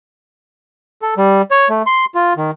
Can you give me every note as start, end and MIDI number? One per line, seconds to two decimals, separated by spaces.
1.02 1.14 69
1.17 1.42 55
1.51 1.68 73
1.70 1.82 57
1.86 2.05 84
2.15 2.33 65
2.37 2.51 51